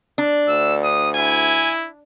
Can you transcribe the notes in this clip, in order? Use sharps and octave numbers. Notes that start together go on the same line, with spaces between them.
D4
D2 E6
D#6
E4 G#5